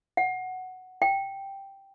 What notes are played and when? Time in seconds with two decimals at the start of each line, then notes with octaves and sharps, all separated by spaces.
0.17 F#5
1.02 G5